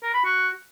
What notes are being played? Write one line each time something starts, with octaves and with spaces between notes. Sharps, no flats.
A#4
B5
F#4